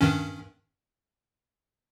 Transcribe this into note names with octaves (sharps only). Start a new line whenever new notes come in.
G2 D#3 C#4